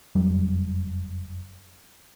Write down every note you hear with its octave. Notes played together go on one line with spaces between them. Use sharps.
F#1 F2 F#3 G3